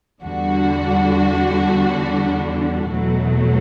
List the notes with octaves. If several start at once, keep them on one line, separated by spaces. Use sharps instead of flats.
E2 D3 G3 D4 F#4
E2 B2 F#3 A3